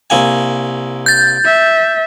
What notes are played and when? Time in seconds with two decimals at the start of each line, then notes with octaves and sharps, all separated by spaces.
0.10 C2 A#3 G#5
1.06 G6 A6
1.45 E5